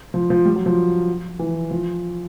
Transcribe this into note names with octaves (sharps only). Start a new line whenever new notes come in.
F3
F3
G3
F#3
F3
E3
F3